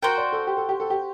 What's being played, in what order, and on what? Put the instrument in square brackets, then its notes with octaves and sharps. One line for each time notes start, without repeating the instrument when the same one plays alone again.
[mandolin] F#4 C5 G5 [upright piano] A#4
[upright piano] D5
A4
G4
A4
G4
A4
G4